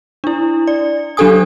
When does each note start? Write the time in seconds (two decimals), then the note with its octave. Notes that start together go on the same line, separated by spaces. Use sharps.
0.24 D4 E4
0.67 D5
1.17 F#3 D4 G4 A4 G#5 D#6